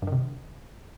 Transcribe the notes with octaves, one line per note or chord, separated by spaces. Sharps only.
G2
D#3
C3